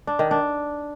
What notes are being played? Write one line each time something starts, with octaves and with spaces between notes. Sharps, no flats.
D4
D#3
D4